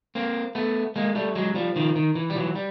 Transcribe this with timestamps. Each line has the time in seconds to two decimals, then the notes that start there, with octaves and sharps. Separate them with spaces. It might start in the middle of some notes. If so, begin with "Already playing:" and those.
0.15 A#3 C4
0.55 A3 B3
0.96 G#3 A#3
1.15 G3 A3
1.35 F#3 G#3
1.55 F3 G3
1.76 D#3 F3
1.96 D#3
2.15 E3
2.30 G3
2.35 E3 F#3
2.55 G3